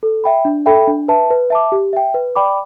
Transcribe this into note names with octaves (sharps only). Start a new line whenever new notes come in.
A4
E5 G5 B5
D4
A4 E5 G5 B5
D4
B4 E5 A5
B4
E5 A5 D6
G4
E5 G5
B4
D5 G5 B5 D6